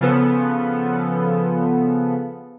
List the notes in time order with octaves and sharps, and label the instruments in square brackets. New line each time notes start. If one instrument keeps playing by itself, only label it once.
[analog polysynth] C#3 F3 B3 A4